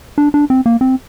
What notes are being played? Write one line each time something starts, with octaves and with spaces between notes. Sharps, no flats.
D4
D4
C4
A#3
C4